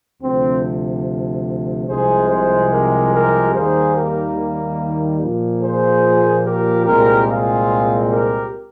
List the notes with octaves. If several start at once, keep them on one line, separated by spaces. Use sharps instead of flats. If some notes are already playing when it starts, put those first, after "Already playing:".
D2 C3 F3 C4
C2 C3 F3 G#3 G#4 C5
G#4 C5
G4 A#4
G4 A#4
D#2 D#3 G3 A#3 G#4 C5
G4 A#4
A#2 F3 A#3
G#4 C5
G4 A#4
C2 A#2 G#3 C4 G4 A#4
F4 G#4
G4 A#4